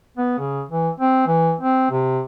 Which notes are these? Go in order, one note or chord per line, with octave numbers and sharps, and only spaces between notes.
B3
C#3
E3
C4
E3
C4
C3